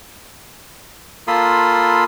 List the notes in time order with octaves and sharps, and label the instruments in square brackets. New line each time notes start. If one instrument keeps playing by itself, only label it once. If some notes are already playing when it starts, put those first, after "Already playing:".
[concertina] A#3 F4 A4 B5 C6 D#6